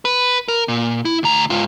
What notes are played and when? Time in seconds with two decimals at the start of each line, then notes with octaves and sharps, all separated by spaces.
0.05 B4
0.48 A#4
0.68 A#2
1.05 E4
1.23 D2 A#5
1.50 G#2 F4